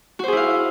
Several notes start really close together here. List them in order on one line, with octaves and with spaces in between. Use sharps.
F#4 C5 G#4 E4 F5